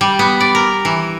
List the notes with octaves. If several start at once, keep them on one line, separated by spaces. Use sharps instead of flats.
G3
B3
D5
A#4
E3